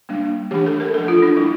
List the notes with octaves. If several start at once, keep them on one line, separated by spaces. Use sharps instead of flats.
G3 A#3 D4
E3 A3 D4 G4
A4
A#4
F3 A3 D4 A4
F4
D4
G3 A#3 D4 E4